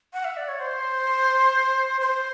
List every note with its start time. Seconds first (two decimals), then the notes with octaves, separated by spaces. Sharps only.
0.13 F#5
0.24 E5
0.37 D5
0.48 C#5
0.60 C5
2.01 C5